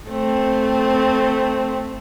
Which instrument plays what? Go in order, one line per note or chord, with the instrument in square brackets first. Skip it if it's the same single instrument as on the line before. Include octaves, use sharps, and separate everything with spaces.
[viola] A3 C4